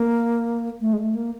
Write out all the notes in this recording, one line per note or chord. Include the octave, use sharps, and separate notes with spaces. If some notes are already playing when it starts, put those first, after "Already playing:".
Already playing: A#3
A3
G#3
A3
A#3